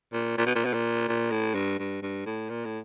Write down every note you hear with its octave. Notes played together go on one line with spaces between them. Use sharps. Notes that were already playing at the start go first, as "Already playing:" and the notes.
A#2
A#2
B2
A#2
B2
A#2
A#2
A2
G2
G2
G2
A2
A#2
A2